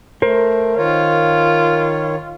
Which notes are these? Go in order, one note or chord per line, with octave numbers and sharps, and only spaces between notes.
A3 A#4 C5
D#3 F4 C#5